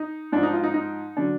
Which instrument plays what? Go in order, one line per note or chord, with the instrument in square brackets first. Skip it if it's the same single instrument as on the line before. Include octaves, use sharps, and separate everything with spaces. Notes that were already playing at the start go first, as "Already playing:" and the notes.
Already playing: [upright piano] D#4
G#2 F3 D4
D#4
F4
D#4
D#4
D3 F#3 D4